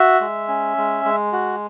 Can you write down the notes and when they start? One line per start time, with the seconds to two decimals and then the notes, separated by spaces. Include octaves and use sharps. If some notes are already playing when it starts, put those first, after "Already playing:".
Already playing: F#4 E5
0.21 G#3
0.48 C#4
0.77 G#3
1.05 G#3
1.32 F#4